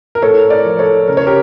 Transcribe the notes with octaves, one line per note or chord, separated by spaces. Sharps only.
A#4
A2 A4 C#5
A#4 D5
F3
A4 C#5
C#3 A#4
C#5
G4 A#4